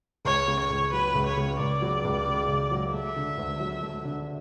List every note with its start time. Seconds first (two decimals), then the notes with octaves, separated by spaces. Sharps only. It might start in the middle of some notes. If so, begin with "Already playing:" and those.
0.25 C#2 C#5
0.48 C#3
0.59 C#5
0.70 C#2
0.92 F#3 B4
1.15 C#2
1.26 C#5
1.37 C#3
1.59 C#2 D5
1.82 F#3
2.05 C#2
2.27 C#3
2.48 C#2
2.71 F#3
2.93 A3 E5
3.16 D3
3.38 D2
3.60 F#3
3.83 A3
4.05 D3